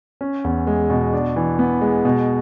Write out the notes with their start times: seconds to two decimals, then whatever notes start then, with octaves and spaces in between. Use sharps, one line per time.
0.21 C#4
0.44 E2
0.67 G#3
0.90 B2
1.13 D4
1.36 E3
1.59 B3
1.81 G#3
2.05 B2